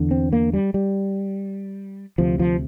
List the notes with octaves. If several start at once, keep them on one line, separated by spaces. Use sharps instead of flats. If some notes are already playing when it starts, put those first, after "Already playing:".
Already playing: E2 D3
C4
A#3
G3
G3
D2 C3 F3
F3